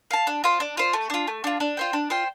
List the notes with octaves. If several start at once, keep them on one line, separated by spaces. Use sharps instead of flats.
F5 A5
D4
F4 C5
D4
F4 C5
A3
D4 F4
A3
D4 F4
D4
F4 C5 G5
D4
F4 C5 G5